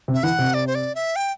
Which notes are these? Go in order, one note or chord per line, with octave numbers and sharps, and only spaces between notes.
C3
E5
E3 F#5
C3
D5
C5
D5
E5
G5